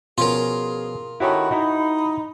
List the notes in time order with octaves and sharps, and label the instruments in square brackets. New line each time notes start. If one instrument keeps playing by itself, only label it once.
[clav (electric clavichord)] B2 F3 C#4 [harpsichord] F4 A#4 [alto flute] G#4
[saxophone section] D#3 C#4 F#4 [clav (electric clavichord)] E4 G4 A4 [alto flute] B5
[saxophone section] D#4 [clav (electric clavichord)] E4 F#4